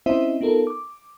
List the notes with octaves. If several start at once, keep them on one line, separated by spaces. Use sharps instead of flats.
C4 C#4 E4 C5 D#5 E5
B3 D#4 F4 A4 A#4
D6